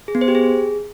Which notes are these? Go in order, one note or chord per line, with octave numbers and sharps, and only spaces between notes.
G#4
B3
C5
G4
G#4